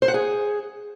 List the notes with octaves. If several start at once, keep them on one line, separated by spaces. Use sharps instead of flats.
C5
F#5
G#4